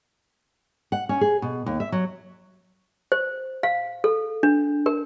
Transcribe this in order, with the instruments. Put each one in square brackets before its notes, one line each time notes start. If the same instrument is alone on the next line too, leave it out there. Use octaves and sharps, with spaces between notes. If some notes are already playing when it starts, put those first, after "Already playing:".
[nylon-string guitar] F#5
C#4
G#4
B2
D#2
E5
F#3
[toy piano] C5
F5
A4
D4
A#4